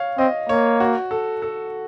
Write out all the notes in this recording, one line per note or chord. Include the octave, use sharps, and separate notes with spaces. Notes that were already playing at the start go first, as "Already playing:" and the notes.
Already playing: C#5 F5
C4 D#5
A#3 C#5
F#4
A4
A4